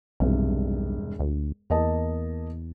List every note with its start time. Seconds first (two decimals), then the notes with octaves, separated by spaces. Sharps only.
0.20 E1 B1 G2 C3
1.19 D2
1.70 E2 A#3 D#5 A5